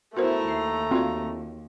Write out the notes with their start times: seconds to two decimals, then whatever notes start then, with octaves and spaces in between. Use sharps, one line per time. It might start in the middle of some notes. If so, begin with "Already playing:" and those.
0.17 A3 B3 E4 F#4 A#4 C5 A#5
0.48 D#2 C7
0.91 C4 F4 F#4 D5 F5